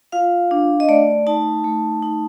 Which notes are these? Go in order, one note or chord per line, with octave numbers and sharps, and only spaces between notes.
F4 F5
D4
D#5
A3 D5
D#4 A5
A3
D#4